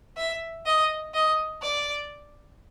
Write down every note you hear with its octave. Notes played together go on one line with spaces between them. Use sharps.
E5
D#5
D#5
D5